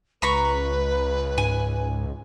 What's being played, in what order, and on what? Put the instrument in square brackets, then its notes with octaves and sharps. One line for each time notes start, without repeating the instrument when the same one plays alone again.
[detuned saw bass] C#2 [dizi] B4 [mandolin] A#5 B5 C#6
[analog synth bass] G#2 [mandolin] G#5